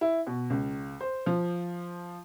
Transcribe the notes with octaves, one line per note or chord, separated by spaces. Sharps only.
E4
B2
C#2
C5
F3